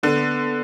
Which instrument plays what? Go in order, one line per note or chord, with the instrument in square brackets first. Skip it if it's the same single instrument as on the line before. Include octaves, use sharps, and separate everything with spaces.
[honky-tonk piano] D3 [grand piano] B3